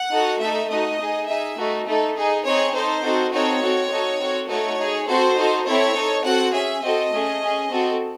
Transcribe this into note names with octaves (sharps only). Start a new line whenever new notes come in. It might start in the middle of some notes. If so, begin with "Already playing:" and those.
Already playing: F#5
D#4 F#4 A4
A3 D#4 A4 E5
A3 D#4 F#4 D#5
D#4 G#4
D#4 G#4 E5
A3 D#4 F#4
A3 D#4 A4
D#4 G#4
C4 D#4 G#4 C#5
D#4 A4 C5
C4 D#4 F#4 A4
C4 D#4 F#4 A4 C#5
C4 F#4 A4
D#4 F#4 A4
C4 F#4 A4
A3 D#4 F#4 A4 C#5
D#4 G#4
C4 F#4 A4 C5
D#4 F#4 A4
C4 E4 A4 C#5
D#4 A4
C4 F#4 A4 F#5
C#4 G#4 E5
C4 F#4 A4 D#5
A3 C#4 G#4
C#4 G#4
C4 F#4 A4